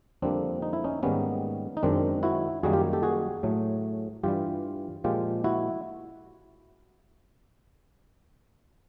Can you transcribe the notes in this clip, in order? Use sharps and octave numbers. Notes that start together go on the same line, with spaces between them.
F2 D3 G3 A#3 C4 D4
D#4
E4
C#4 D#4
G#2 D#3 G3 A#3 B3 C#4
D#4
F#2 D#3 G#3 C4 D4
E4 F#4
F#2 D#3 G3 A#3 F#4 G#4
F4 G4
G4 A4
F#4 G#4
A2 F#3 A3
G2 E3 G3 F4 G4
A#2 F3 G#3 F4 G4
E4 F#4